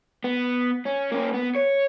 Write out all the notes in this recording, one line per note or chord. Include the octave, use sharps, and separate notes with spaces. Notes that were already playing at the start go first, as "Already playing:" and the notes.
B3
C#4
A#3 C#4
B3
C#5